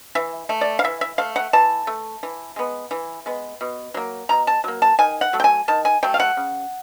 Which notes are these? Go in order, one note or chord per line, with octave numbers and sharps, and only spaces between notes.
E3 E5
A3
D5
F5
E3 E5
E5
A3 F5
F#5
E3 A5
A3
E3
G#3 B3
E3
G#3 B3
B2
F#3 A#3
B2 A#5
A5
F#3 A#3
A5
D#3 G#5
F#5
F#3 A3
G5
G#5
D#3 A5
G#5
F#3 A3 G5
F5
F#5
C#3